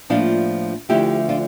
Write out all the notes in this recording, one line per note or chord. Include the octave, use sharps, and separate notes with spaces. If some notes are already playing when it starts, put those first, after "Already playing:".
A2 F3 A#3 D4 F4
D2 D3 F3 A3 E4 G4
D4 F4